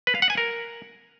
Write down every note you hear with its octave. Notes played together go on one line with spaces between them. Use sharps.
B4
F5
F#5
G#5
A#4